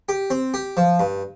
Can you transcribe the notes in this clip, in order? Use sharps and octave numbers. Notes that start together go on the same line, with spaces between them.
G4
C4
G4
F3
G2